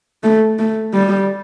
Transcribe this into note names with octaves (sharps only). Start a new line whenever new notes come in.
A3
A3
G3